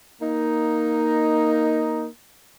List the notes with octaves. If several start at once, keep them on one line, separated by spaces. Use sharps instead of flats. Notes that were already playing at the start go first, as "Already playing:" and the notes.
A#3 D#4